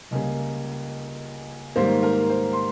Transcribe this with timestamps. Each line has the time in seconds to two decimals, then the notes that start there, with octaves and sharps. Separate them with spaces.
0.11 C#2 C#3 G3 A#3 D#5
1.76 G#2 D#3 G3 A#3 C5
2.03 A#4
2.30 C5
2.53 C6